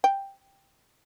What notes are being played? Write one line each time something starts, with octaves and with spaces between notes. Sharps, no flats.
G5